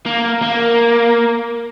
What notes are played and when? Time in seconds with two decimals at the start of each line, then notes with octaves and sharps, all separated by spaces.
0.06 A#3
0.42 A#3